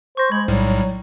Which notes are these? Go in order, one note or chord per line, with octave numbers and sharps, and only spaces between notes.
C5 C#6 A#6
G#3 B5 G#6
B1 A2 F#3 G3